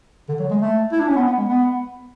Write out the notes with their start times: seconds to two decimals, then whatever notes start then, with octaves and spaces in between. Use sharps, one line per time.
0.29 D3
0.39 F#3
0.51 G#3
0.61 A3
0.92 E4
1.00 D4
1.08 C#4
1.16 B3
1.27 B3
1.37 G#3
1.48 B3